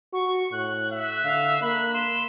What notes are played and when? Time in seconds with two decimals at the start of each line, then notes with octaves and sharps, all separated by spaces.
0.13 F#4 C#6
0.52 A2 F#6
0.93 E5
1.24 D3 F5
1.62 A#3 B5 F#6
1.94 C6 E7